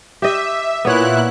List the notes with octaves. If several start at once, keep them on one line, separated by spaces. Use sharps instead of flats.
G4 D#5 E5
A#2 B3 E4 C#5 F#6